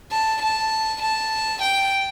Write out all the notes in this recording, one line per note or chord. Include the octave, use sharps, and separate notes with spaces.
A5
A5
A5
G5